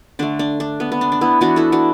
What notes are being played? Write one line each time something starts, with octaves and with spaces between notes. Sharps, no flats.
D3 A3 D4
D4
D4
B3
B3
D4
D4
B3 E4
E3 B3 D4 F#4
E4 A4
D4 F#4